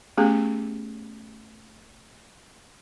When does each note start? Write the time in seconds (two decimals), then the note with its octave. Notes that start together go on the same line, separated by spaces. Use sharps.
0.18 A3 B3 C#4 G4 G#4